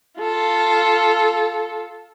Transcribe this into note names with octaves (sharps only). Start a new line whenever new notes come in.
F4 A4